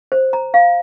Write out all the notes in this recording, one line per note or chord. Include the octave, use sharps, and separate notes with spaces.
C5
A#5
F5